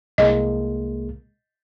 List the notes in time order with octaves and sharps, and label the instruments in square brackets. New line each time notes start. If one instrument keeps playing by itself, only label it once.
[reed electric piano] C2 G#3 A#3 [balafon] D#5